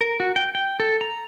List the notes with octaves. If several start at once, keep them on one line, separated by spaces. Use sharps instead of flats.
A#4
F#4
G5
G5
A4
A#5